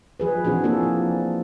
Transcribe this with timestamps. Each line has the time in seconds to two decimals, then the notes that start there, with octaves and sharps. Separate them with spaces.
0.20 F3 G#4 B4
0.44 E3 C4 D4 F#4 G#4
0.63 F3 A#3 G#4 A4
0.83 F3